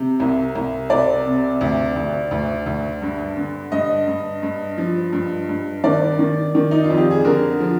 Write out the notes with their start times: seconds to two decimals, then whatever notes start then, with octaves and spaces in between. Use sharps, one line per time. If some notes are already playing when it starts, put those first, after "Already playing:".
Already playing: C3
0.20 C2
0.55 C2
0.90 C2 D5
1.26 C3
1.61 D2
1.96 D2
2.31 D2
2.66 D2
3.02 G2
3.37 D3
3.72 G2 D#5
4.07 G2
4.43 G2
4.78 F3
5.13 G2
5.49 G2
5.84 D#3 D5
6.19 D#3
6.55 D#3
6.71 D#4
6.84 F4
6.90 F2
6.97 G4
7.11 G#4
7.25 D3 A#4
7.60 F3